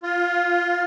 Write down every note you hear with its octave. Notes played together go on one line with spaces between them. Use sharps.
F4